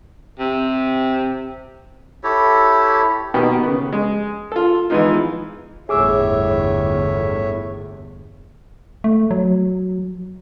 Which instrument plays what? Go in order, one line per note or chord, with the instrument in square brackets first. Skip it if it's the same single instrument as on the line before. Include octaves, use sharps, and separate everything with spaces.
[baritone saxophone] C3
[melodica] E4 G4 A4 C#5
[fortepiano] B2 D#3 A#3 B3 G4
C#3 B3
G#3
F4 A4
E3 F3 G#3 B3 D#4 F4
[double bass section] G1 E2 [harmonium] A2 C#5 E5 [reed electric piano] G#4 D6 E6
[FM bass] A3
F#3